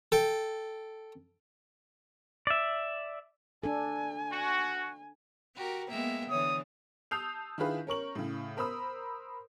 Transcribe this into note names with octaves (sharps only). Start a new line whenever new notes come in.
A4 G5
D5 E5
D4 A4 G#5
F#4
F#4 G4 A#4
G#3 A#3 B3 E5 G5
D3 E3 C#5 D#6
A5 D#6 E6 G6 C7 F7
D#3 D4 E4 F4 G#4 B4
C#4 A#4 C#6 F#7
A2 C#3
A#4 C5 B5 D#6 E6